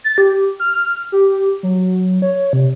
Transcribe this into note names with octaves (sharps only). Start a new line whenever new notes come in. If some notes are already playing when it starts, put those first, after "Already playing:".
A6
G4
F6
G4
F#3
C#5
C3